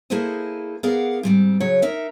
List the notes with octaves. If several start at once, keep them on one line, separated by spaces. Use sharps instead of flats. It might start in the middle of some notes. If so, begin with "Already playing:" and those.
A#3 E4 G#4 A4 C5 D#5
B3 G#4 A#4 D5 F5 F#5
G#2 G3 C4
C#3 F#3 C#5
D#4 A#4 E5